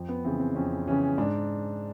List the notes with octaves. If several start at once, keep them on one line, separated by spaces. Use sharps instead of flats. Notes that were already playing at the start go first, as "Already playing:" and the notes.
Already playing: F2
B3
C#3 E3 C4
C4
F2 C#4
C#3 E3 C#4
G#2 D4